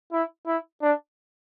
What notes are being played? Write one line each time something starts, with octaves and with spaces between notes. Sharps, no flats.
E4
E4
D4